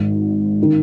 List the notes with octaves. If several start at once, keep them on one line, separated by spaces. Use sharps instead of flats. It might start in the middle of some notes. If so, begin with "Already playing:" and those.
Already playing: G#1 G#2 D#3
D#3